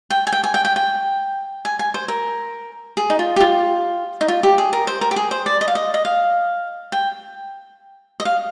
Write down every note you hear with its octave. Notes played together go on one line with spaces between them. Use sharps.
G5
G#5
G5
G#5
G5
G5
G5
G#5
G#5
C5
A#4
G#4
D#4
F4
G4
F4
D#4
F4
G4
G#4
A#4
C5
A#4
G4
G#4
C5
D5
D#5
F5
D#5
D#5
F5
G5
D#5
F5